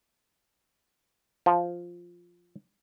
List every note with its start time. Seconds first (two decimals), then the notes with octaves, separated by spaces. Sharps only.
1.46 F3